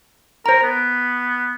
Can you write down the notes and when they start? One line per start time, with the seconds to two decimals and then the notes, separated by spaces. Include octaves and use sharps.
0.46 A#4 C5 A#5
0.63 B3